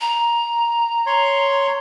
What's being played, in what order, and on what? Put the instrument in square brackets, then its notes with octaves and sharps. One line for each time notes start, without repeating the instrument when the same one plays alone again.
[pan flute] A#5
[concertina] C#5 C6